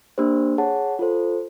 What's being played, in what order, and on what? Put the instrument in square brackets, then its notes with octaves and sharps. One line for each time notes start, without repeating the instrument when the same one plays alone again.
[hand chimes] A#3 D4 G4 C5
G#4 C#5 F#5 A5
F4 A4 C5